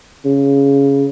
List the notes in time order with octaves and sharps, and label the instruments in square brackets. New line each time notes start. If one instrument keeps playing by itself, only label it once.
[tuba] C#3